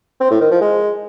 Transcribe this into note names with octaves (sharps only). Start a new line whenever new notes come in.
C4
A2
D#3
F3
G#3